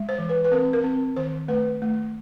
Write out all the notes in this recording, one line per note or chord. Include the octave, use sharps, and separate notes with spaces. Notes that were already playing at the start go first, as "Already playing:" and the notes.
Already playing: G#3
C5
E3
B4
B4
C4 A#4
A#4
C4
D#3 C5
A3 B4
A3